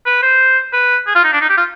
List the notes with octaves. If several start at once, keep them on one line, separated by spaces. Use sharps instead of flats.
B4
C5
B4
G#4
F4
D#4
D4
D#4
G4
F4